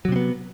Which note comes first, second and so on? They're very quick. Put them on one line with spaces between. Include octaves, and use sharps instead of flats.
F#3 C3 C4 B3